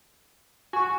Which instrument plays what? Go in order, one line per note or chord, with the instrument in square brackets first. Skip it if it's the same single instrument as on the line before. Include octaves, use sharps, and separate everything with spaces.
[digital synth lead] F#4 [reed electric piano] G#5 C#6